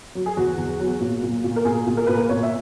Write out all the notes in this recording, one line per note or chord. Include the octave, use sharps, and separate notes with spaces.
F#3
G#4
E2 F#4
E2
F#3
A#2
A#2
A#2
A#4
A#2 G#4
A#2
A#4
A#2 B4
A#4
A#2 C#5
E5